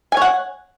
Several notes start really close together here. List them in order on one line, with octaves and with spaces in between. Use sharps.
G#5 C#5 F#5